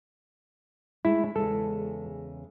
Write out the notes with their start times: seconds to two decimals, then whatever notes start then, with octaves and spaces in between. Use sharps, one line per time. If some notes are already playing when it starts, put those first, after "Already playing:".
1.05 G#3 A3 E4
1.36 E2 C#3 G#3 A4